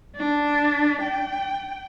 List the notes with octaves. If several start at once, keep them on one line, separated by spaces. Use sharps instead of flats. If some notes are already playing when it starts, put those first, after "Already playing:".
D4
G5